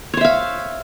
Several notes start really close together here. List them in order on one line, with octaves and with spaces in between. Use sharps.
C#5 C5 E5 F5